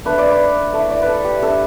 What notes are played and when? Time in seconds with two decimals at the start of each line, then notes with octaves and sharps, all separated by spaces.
0.05 A3 D4 B4
0.18 D5
0.31 B4
0.73 A3 E4
0.90 D5
1.02 B4
1.08 A4
1.24 G4
1.42 A3 D4 A4